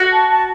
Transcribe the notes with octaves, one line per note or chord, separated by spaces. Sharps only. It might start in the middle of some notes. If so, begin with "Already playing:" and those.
Already playing: F#4
A5
A5